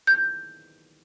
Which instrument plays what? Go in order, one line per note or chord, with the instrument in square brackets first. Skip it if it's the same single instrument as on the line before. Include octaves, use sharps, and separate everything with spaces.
[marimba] G6